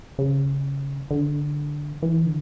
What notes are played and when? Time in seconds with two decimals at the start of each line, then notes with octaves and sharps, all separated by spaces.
0.19 C#3
1.11 D3
2.02 E3
2.26 D3